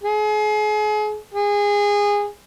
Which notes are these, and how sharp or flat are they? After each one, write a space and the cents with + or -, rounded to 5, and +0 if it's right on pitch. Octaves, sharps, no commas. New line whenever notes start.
G#4 +35
G#4 -20